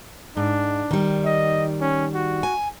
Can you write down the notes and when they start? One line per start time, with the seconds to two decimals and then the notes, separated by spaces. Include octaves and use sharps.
0.37 G#2 D4
0.91 D#3 G3
1.25 D#5
1.81 C#4
2.14 F#4
2.43 G#5